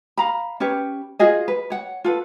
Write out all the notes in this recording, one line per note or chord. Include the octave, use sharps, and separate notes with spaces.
F5 A#5 B5
C#4 G4 B4 C#5
F4 F#4 G#4 D#5
B4
C#5 F#5
F4 A4 B4